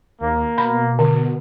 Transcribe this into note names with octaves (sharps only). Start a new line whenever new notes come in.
D#2 A#3
B2 B5
D3